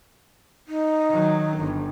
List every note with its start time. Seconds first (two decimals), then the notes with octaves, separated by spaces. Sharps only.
0.68 D#4
1.10 D#3 F#3
1.58 G1